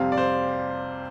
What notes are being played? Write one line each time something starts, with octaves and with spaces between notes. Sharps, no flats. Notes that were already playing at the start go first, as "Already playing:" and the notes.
Already playing: F2 C3 G3 C4 F5
D5
C5